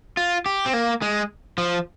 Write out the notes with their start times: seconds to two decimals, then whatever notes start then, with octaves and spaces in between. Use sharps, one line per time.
0.17 F4
0.46 G4
0.66 C4
0.73 A#3
1.02 G#3
1.58 F3